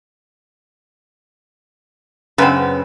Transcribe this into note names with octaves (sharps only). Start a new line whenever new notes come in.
F#2 C#3 B3 C4 B4